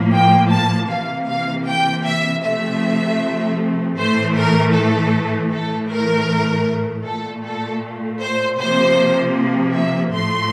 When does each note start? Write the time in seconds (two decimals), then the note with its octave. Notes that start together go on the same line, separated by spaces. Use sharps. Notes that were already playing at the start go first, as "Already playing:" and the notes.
Already playing: A2 F3 A#3
0.12 G5
0.51 A5
0.89 C3 E3 A#3 F5
1.27 F5
1.67 G5
2.05 E5
2.43 C3 F3 A3 E5
3.97 A2 E3 A3 C5
4.35 A#4
4.74 A4
5.51 A2 E3 A3 A4
5.89 A#4
7.05 A#2 A3 A4
7.44 A4
8.21 C5
8.59 C3 F3 A#3 C5
9.74 E5
10.13 A2 F3 A3 C6